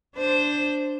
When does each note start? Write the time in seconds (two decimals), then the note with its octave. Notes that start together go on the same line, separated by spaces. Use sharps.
0.16 D4 C5